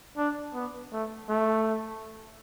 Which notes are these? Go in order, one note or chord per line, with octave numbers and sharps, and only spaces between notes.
D4
B3
A3
A3